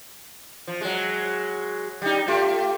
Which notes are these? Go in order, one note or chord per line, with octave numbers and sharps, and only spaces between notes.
F3
F#3 G#3
G3 D#4
A3 F4 G4